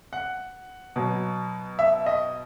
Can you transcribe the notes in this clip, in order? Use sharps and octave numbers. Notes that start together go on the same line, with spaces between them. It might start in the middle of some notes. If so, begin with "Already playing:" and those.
F#5
B2 F#3
E5
D#5